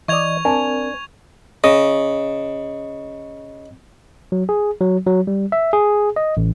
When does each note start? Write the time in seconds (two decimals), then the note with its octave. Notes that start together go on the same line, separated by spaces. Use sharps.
0.08 E3 D5 D#5 C#6 G#6 F7
0.45 C4 D4 A#4 G#5
1.64 C#3 D#5
4.32 F#3
4.49 G#4
4.81 F#3
5.07 F#3
5.27 G3
5.52 E5
5.73 G#4
6.16 D#5
6.37 A1